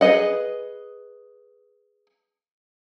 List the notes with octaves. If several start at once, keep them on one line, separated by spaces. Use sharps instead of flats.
G#4 B4 C5 D#5 F#5